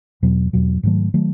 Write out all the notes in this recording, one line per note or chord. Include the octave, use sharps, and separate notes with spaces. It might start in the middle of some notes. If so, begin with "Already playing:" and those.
E2 B2 F#3
E2 B2 F#3
G#2 D#3 F#3 A3
D#3 F#3 A3